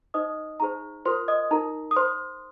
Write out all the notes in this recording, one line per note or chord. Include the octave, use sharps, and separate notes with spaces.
D#4 C5 D#5 D#6
D#4 G#4 C5 A#5
F4 A#4 C5 C6
D#5 D#6
D#4 A#4 A#5
D#6
C5 C6